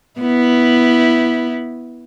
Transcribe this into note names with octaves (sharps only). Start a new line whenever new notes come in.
B3 E4